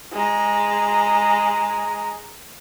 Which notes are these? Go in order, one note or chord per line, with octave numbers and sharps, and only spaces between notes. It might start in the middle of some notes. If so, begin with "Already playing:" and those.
G#3 A#5